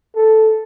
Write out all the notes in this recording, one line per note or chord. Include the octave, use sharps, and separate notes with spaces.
A4